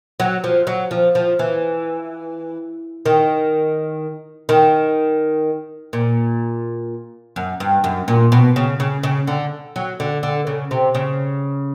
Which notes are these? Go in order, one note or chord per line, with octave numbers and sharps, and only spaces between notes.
F#3
F3
F#3
F3
F3
E3
D#3
D#3
A#2
F#2
G2
F#2
A#2
B2
C#3
C#3
C#3
D3
F#3
D3
D3
C#3
C3
C#3